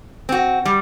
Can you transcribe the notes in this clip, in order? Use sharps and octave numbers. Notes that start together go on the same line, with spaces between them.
C4 F#4
G3